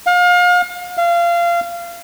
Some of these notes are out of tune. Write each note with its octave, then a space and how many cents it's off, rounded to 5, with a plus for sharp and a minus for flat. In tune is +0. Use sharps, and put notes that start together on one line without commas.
F5 +35
F5 -25